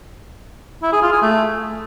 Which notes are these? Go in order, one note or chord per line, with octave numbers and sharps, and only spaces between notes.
E4
G#4
F4
G#4
A3